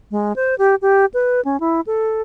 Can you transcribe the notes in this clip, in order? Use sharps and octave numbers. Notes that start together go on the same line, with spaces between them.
G#3
C5
G4
G4
B4
C#4
E4
A4